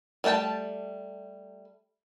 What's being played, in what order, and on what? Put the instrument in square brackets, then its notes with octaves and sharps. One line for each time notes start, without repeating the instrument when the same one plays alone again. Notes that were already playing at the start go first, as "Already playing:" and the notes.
[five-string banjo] G3 A3 F#4 G5 A5